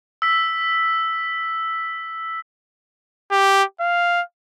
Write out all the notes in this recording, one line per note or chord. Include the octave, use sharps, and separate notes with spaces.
E6 B6
G4
F5